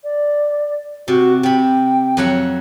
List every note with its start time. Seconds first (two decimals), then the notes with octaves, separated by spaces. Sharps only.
0.04 D5
1.08 C3 F#4
1.43 C3 G5 B5
2.17 F2 F#3 F#5